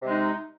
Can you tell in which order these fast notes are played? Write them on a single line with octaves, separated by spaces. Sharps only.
C3 G#3 D#4